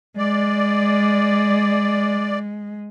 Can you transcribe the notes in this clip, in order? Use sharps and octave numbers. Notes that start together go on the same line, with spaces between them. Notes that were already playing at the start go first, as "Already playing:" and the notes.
G#3 D5